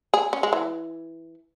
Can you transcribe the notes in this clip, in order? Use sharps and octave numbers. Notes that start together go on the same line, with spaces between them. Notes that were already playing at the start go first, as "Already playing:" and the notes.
G#4
C#4
G#3
E3